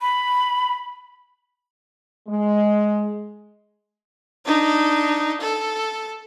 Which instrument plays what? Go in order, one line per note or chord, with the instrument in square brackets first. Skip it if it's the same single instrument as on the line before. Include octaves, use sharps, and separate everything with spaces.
[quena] B5
[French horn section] G#3
[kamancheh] D4 D#4
A4